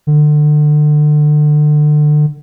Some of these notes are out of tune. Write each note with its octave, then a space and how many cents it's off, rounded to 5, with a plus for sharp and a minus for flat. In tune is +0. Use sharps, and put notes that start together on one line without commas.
D3 +30